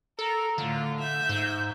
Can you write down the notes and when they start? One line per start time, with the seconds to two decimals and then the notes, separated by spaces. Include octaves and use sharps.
0.19 A4 A#4
0.58 A2 D3 F4
1.00 E5 G6
1.29 G#2